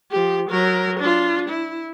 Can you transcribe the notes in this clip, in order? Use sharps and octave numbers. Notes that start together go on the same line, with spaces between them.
F3 G4
F#3 A#4
D4 F4
E4